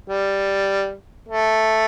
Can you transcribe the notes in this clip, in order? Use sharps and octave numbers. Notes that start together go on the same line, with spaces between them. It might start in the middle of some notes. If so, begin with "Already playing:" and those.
G3
A3